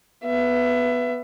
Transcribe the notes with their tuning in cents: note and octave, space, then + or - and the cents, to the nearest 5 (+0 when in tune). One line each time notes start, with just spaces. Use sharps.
B3 +0 E5 +25